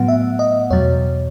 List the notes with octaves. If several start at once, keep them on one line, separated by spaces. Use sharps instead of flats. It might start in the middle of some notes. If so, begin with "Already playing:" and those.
Already playing: A2 F#3 B3 F#5
E5
D#5
E2 B2 F#3 C#5